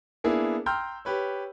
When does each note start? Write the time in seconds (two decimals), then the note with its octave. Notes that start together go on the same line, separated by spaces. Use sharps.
0.24 A#3 B3 D4 E4 G#4
0.66 G5 A#5 C6 E6 F6 G6
1.05 G4 B4 C#5